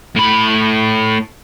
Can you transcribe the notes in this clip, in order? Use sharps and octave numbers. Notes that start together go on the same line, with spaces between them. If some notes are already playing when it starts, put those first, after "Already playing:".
A2 B5